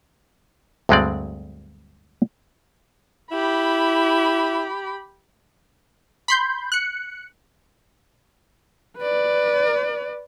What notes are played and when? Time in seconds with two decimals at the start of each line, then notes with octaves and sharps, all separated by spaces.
0.89 D2 G2 F#3 G#3 C4 D5
3.31 E4 G4 B5
6.28 B5 C6 G6
6.72 F#6 C#7
8.98 B4 D5